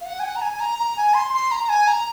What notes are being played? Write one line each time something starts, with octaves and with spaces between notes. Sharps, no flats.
F5
F#5
G#5
F#5
A#5
G#5
G#5
A#5
A#5
G#5
C6
C6
A#5
A#5
G#5
A#5